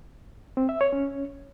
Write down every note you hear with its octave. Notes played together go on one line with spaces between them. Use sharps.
C4
E5
C#5
C#4